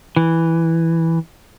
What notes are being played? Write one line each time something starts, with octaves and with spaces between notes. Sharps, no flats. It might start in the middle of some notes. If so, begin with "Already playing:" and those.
E3